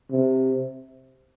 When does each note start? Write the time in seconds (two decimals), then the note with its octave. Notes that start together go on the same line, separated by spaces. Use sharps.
0.11 C3